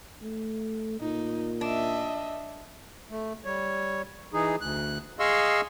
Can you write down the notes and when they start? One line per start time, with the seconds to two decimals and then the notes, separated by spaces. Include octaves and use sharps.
0.22 A3
1.01 A#2 D#4
1.61 D4 D#5 E5
3.11 A3
3.45 G3 C#5
4.33 E3 D#4 G#4
4.61 D2 F#6
5.19 G#4 D#5 F5 C6 C#6 E6